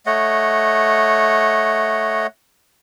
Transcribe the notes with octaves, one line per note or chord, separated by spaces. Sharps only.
A3 C#5 D#5 F#5